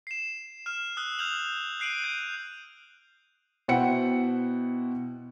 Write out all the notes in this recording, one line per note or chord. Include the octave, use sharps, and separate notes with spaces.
C7 E7
F6 E7
D#6 E6 F#6
F6 G6 F7 F#7
F#6 C7 D7 D#7 F#7
G6
B2 E4 C5 F#5 G5 C#7